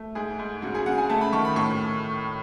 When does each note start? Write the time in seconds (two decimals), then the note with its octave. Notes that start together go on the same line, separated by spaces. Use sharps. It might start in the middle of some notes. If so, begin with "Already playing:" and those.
Already playing: A3
0.15 G#2 G#4
0.39 G#2
0.62 C#3 F#4
0.75 G#4
0.86 C#3 F#5
0.98 G#5
1.09 A3 A5
1.21 B5
1.33 D#3 C#6
1.45 B5
1.56 A2 C#6